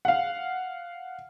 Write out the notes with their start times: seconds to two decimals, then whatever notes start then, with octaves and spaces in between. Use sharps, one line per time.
0.05 F5 F#5